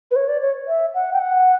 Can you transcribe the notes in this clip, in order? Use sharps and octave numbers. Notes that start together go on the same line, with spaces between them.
B4
C#5
D5
C#5
E5
F#5
G5
F#5